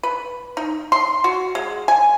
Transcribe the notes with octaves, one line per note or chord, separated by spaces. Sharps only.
B4
D#4
C6
F#4
G#3
G#5